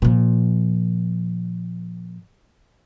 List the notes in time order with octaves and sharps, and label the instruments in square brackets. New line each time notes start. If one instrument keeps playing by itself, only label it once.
[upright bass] A#2 F3